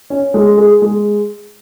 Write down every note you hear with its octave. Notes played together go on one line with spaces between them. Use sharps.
C#4
G#3
G#4
G#3